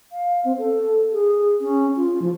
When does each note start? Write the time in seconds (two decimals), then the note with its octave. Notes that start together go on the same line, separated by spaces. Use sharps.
0.12 F5
0.45 C4
0.58 A4
1.13 G#4
1.61 C#4
1.96 F4
2.22 F3